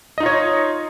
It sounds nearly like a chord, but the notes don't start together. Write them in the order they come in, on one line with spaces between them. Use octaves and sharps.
D#5 D#4 F4 C#5